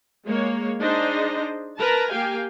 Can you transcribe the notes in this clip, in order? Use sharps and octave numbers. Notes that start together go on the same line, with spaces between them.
G#3 A#3 C#5
D4 D#4 G#4 C5 D#5
A#4 B4 A5 A#5
A#3 G4 F5 G5 G#5